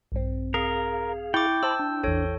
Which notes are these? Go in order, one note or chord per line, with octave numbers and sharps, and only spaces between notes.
A#1 G2 C4
G#4 A#4 F5
E4 G5 C#6 D6
E4 C5 A5 B5 E6
D4
A1 E2 A4 C#5